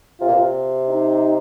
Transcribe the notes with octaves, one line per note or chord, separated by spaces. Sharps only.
C3 F4
A#2
C3
D#4